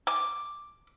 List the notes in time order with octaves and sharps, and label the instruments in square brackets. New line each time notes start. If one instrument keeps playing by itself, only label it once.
[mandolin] D6